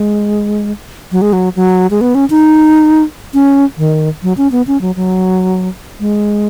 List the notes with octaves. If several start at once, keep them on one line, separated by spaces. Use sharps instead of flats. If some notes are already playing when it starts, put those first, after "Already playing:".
Already playing: G#3
F#3
G#3
F#3
F#3
G#3
B3
C#4
D#4
C#4
D#3
F#3
C#4
B3
C#4
F#3
F#3
G#3